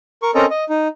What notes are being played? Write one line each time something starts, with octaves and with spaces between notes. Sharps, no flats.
A#4 C#6
C4 C#4 A4 A#4 D#5 A#5
D#5
D#4